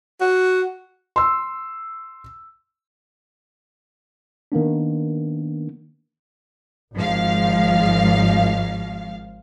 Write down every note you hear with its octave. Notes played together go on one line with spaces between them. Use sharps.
F#4
C6 E6
D#3 A#3 B3 D4
G#1 G#2 F3 F5